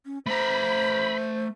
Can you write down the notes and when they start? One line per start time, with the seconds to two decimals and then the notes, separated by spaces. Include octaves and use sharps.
0.05 C#4
0.26 A3 C5 A#5 B5